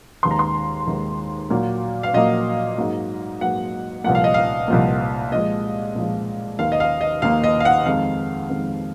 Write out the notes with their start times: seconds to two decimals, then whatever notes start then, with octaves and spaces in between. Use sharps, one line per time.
0.23 D#2 D#3 G#3 C6
0.31 A#5
0.39 C6
0.87 D#2 D#3 G#3
1.50 A#2 F#3 A#3
2.03 F5
2.14 A#2 F#3 A#3 D#5
2.78 G#2 F#3 A#3
3.41 G#2 F#3 A#3 F#5
4.04 C2 A#2 F3 A#3 F#5
4.15 F5
4.24 D#5
4.34 F5
4.68 C2 A#2 F3 A#3
5.31 A#2 F3 G#3 D#5
5.95 A#2 F3 G#3
6.59 D#2 D#3 A#3 F5
6.72 D#5
6.80 F5
7.01 D#5
7.22 D#2 D#3 A#3 F5
7.44 D#5
7.60 F5
7.65 F#5
7.86 F2 D#3 G#3 F5
8.49 F2 D#3 G#3